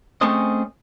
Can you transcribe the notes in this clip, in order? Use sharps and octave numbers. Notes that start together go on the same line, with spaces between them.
A3 C4 C#4 G#4 C5 D#5